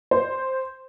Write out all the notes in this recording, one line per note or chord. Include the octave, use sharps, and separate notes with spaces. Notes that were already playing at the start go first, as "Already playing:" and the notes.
C5